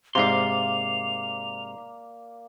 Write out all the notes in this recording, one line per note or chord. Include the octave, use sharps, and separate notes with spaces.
G#2 C3 A#3 D5 F5 C6 F7